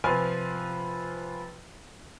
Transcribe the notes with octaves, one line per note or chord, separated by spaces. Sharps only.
C3 F3 F4 B4 G#5